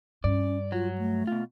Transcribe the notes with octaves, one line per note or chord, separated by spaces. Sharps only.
G2 C#4 D5
F#3 F4
A3
B2 F4